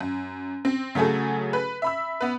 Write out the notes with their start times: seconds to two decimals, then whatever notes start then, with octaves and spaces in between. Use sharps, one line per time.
0.01 F#2
0.65 C4
0.95 C#3 F#3 A3 G#4 A4
1.53 B4
1.82 E5 B5 E6
2.21 B3 B4